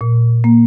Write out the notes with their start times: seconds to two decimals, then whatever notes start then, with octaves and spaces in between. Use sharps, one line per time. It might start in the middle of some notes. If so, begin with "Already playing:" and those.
0.01 A#2
0.44 A#3